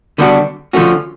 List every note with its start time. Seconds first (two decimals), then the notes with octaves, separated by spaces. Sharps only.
0.18 D3 G3 B3 D4 F#4
0.73 D3 F3 A3 C#4 F#4